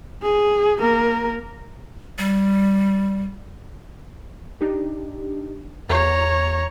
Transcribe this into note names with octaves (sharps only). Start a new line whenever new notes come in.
G#4
A#3 A#4
G3
D4 D#4 G4
E2 C#5 A#5